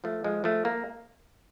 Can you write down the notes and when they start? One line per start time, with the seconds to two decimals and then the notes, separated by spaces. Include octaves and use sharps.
0.04 F3 A3
0.24 F3 G#3
0.44 F3 A3
0.65 A#3